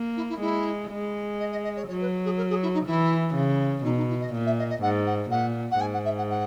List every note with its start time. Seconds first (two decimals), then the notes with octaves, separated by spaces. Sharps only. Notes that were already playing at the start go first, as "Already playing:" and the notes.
Already playing: A#3
0.16 E4
0.29 E4
0.41 G#3 E4
0.90 G#3
1.39 D#5
1.51 D#5
1.63 D#5
1.76 C#5
1.88 F#3 C#5
2.01 B4
2.24 G#4
2.37 A#4
2.49 G#4
2.62 E4
2.73 D#4
2.86 E3 E4
3.35 C#3
3.84 B2 D#4
3.96 D#4
4.09 E4
4.20 D#5
4.33 A#2
4.46 E5
4.58 D#5
4.69 D#5
4.82 G#2 F#5
5.06 F#5
5.31 A#2 F#5
5.71 F#5
5.80 G#2 G#5
5.93 F#5
6.04 E5
6.18 F#5
6.30 F#5